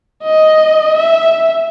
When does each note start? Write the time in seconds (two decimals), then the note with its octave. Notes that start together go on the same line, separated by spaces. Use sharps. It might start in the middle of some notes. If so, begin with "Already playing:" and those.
0.23 D#5
0.97 E5